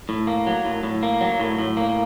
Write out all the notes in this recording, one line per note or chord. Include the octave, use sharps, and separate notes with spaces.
A2
A#3
F#3
A2
A2
A#3
F#3
A2
A2
A#3